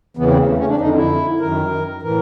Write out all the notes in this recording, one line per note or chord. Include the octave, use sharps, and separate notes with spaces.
E2 C#3 E3 B3
C4
B3
A#3
A3
C#4
D4
F2 D3 D#4
E4
F#2 D#3 A#4
A2 E3 A#4